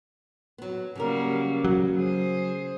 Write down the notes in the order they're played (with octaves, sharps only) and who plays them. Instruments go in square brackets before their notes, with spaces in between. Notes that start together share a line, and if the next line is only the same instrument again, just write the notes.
[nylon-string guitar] F#3 B3
[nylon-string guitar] C#3 C#4 A#4 [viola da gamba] F#3 G3 A#3
[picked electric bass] F#3
[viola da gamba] G#4 C5